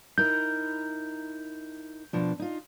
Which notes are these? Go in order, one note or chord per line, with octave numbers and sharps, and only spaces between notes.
D#4 E4 A#4 G6
B2 F3 D4
D#4 F4